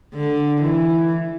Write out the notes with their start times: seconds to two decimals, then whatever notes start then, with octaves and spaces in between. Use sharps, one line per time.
0.15 D3
0.61 E3